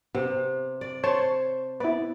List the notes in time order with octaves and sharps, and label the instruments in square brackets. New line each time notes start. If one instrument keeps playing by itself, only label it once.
[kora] C3 [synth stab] B3
[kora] D5
[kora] C5 [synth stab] C#5 A5 C#6
[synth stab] B3 E4 [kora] D5